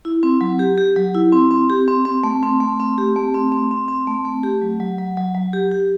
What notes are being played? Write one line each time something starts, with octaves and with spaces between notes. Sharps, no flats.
E4
C4
F#3
G4
G4
F#3
E4
C4
C4
G4
C4
C4
A3
C4
A3
C4
G4
A3
C4
C4
C4
C4
A3
A3
G4
F#3
F#3
F#3
F#3
F#3
G4
G4